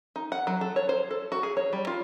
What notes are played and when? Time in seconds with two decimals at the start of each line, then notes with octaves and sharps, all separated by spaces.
0.16 D#4
0.32 F#5
0.47 F#3
0.61 A4
0.76 C#5
0.89 C5
1.11 A4
1.32 F#4
1.43 G#4
1.57 C#5
1.73 G3
1.87 F4